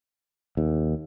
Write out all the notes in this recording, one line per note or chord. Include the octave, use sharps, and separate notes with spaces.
D#2